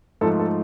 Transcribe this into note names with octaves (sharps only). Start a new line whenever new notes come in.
G#2 F3 A3 A4
A4